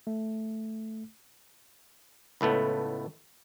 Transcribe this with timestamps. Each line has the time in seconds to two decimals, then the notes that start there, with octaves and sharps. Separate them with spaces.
0.07 A3
2.41 C#2 A2 A3 B3